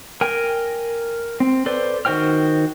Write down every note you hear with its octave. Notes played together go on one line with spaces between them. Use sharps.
A#4 G5 G#5
C4
A4 B4 C5 D5
D#3 F#4 C5 G5 F6